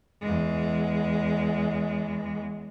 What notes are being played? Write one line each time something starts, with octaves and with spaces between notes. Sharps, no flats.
E2 G#3